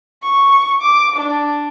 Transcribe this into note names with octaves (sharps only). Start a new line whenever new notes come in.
C#6
D6
D4